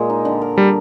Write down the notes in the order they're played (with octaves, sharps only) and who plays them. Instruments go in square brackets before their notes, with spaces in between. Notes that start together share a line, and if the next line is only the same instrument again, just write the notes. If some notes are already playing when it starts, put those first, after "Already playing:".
Already playing: [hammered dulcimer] A#2 G#3 A#3
D#4
D3
A#4
[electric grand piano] G3 [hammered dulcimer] D4